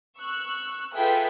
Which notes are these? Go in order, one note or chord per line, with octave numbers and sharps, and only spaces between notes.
C#6 E6 F#6
F4 G#4 A4 B4 E5 G5